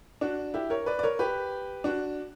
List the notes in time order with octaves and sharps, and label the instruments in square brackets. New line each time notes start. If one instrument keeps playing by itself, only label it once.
[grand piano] D4 F#4
E4 G4
A#4 C#5
B4 D5
D5
A#4 C#5
G4 B4
D4 F#4